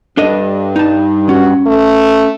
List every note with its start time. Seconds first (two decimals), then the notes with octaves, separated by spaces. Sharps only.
0.17 G2 D4 A4 D#5
0.76 D#4 A5
1.29 C#4 F#4
1.66 A3